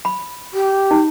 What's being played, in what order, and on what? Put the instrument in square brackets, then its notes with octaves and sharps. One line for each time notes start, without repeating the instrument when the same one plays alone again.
[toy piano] B5
[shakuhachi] G4
[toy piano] D#4